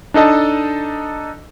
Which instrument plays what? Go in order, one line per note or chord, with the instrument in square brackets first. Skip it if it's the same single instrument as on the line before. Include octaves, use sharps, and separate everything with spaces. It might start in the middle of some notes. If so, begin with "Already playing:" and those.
[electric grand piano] D4 D#4 A4 D#5 A5